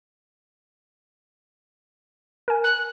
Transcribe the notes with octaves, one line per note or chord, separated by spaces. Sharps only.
A#4 G#5
F#6